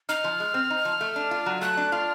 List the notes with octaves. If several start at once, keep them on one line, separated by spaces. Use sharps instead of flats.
D#4 F6
F3
G#3
C4
D#4
F3
A3
D4
F4
F#3
A3 F#6
D4
F4 F6